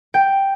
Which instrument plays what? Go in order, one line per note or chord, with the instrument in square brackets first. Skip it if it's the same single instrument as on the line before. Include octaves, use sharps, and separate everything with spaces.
[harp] G5